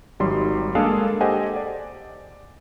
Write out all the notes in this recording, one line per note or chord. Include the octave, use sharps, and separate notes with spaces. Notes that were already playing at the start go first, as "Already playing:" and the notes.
G#1 F#3 G3 D#4 C6
G#3 A#3 D4 G#4 A4 F5
G4 A4 C5 D#5 F#5 G#5
D5